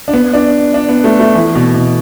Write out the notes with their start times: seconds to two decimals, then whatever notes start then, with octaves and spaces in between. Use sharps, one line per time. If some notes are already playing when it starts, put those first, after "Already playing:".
0.08 D4
0.13 B3
0.34 D4
0.74 D4
0.89 B3
1.04 A3
1.20 A3
1.35 E3
1.55 B2
1.75 B2